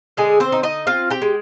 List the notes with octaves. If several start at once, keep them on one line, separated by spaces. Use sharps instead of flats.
D3 G#3 G#4
C4 C5
D#4
D#4 D#5
C4 F4 F5
G4 G5
G#3